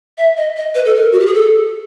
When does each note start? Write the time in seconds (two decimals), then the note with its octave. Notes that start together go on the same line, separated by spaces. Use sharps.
0.18 E5
0.37 D#5
0.57 D#5
0.75 B4
0.85 A4
0.95 A#4
1.12 F#4
1.20 G4
1.26 G#4
1.34 A4